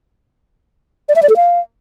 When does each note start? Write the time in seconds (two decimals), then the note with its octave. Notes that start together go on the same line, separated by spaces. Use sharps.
1.09 D5
1.16 E5
1.23 D5
1.29 A4
1.36 F5